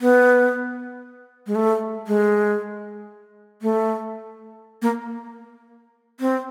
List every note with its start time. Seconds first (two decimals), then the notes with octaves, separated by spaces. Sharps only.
0.01 B3
1.47 G#3
1.55 A3
2.07 G#3
3.62 A3
4.82 A#3
6.20 C4